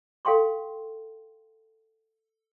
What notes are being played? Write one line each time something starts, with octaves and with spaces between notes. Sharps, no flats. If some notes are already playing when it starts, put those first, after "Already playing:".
A4 F5 G5 C6 C#6